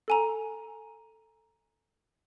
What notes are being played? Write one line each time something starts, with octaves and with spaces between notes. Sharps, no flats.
A4 G#5 A#5